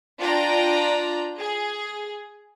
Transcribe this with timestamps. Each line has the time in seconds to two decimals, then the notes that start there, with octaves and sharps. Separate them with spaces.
0.20 D4 F4 D5 G5 A#5
1.39 G#4